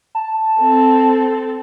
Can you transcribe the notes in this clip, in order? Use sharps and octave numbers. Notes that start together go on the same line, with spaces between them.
A5
C4 A4